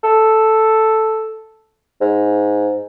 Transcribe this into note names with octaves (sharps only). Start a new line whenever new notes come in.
A4
G#2